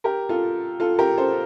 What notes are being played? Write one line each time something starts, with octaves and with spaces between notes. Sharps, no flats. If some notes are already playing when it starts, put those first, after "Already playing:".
G4 A#4
F4 A4
F4 A4
G4 A#4
A4 C5